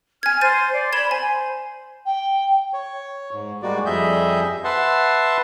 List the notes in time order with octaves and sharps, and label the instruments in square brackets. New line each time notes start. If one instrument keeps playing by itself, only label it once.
[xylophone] G#5 G#6 [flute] F6
[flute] C5 [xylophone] G6 A6 D#7
[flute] D5
[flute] B5 [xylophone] G#6 E7 G7
[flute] C5 [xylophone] G#5
[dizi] G5
[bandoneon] C#5
G#2
G3 G#3 A#3 F#4 D5
F2 G3 G#4 D#5 E5 G6
B4 E5 F#5 A5 C6